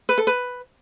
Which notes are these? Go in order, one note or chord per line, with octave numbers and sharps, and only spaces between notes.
B4
A4
B4